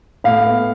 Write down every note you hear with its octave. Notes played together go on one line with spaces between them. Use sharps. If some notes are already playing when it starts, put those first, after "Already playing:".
A2 F5
B3